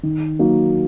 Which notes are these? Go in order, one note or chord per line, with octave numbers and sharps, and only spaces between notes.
D#3
F#3 A#3 D#4 F#4